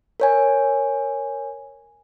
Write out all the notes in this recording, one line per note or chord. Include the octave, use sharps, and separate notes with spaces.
A#4 C#5 G#5